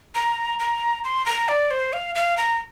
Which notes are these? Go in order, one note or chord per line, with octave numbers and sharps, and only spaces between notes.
A#5
A#5
C6
A#5
D5
C5
F5
F5
A#5